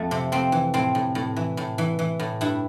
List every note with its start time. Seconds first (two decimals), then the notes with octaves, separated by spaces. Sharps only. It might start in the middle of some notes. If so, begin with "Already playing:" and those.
Already playing: F2 A3
0.11 C3
0.32 F2 C4
0.52 E3
0.74 A2 C4
0.95 A2
1.15 A2
1.36 E3
1.57 A2
1.78 E3
1.99 E3
2.20 A2
2.41 G2 E4